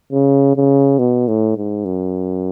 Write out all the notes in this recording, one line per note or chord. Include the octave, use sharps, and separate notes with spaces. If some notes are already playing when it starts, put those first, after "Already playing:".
C#3
C#3
B2
A2
G#2
F#2